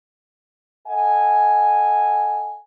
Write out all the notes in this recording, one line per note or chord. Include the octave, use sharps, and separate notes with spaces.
A4 D#5 F#5 G#5